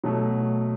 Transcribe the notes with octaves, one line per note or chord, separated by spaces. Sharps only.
B2 F#3 A3